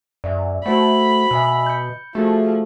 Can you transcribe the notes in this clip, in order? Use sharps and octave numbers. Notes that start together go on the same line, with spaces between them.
F#2 D5 E5
A3 F#4 C5 F#5 B5
B2 E5 G#5 E6
G6 C#7
F3 A3 F#4 G#4 A4